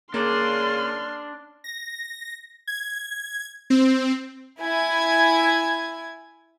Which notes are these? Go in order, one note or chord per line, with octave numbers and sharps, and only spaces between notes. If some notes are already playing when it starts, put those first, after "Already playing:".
C#3 A#3 D4 D5 C6 F6
A#6
G#6
C4
E4 G#5 G#6